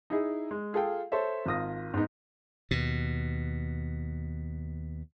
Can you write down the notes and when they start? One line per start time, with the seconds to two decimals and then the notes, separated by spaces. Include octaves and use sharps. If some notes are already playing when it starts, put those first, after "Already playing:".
0.10 D#4 E4 G#4
0.51 G#3
0.73 F4 G#4 A4 F5 G5
1.12 A4 C5 C#5 E5
1.46 G#1 F4 D#6 A#6
1.94 G#2 B3 D#4
2.71 D#2 B2